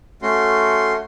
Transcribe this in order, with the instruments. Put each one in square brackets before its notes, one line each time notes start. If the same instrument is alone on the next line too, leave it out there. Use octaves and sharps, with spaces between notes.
[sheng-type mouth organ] A3 C#4 F#4 C6